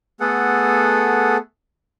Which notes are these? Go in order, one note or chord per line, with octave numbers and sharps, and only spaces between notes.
A3 B3 G#4 A4 F#5